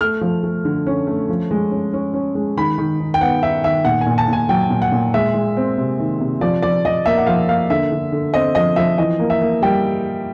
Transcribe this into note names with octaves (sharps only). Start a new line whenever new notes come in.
A3 F6
F3
A3
D3
C#4
A3
F3
G#3
C#4
C#4
C#4
G#3
D#3 B5
D#3
D#4
G5
B3 F#5
D#4 E5
D#3 E5
A#2 F#5
G#5
A#2
A5
A#2 G#5
F#3 G5
A#2
F#5
A#2
G#3 E5
G#3
C4
C3
D#3
C3
F3 D5
F3 D5
F3 D#5
A#3 E5
F#5
F3 F5
A#3 F5
D3 E5
D3
D3
C4 D#5
F3 D#5
F3 E5
E3 D#5
A#3
E5
A#3
G3 G5